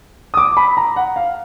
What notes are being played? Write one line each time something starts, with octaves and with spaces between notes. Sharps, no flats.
D#6
D6
B5
A#5
F#5
F5